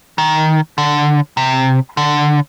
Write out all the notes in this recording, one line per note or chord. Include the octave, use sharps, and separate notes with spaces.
D#3
D3
C3
D3